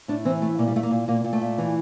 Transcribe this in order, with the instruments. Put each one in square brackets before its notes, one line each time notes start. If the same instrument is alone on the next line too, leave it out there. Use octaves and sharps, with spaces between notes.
[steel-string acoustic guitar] A2 D4
E3 C4
A2 A3
A#2 A#3
G3
A#2 A3
A#3
A#2
A#2 A#3
A#2
A3
A#2
E3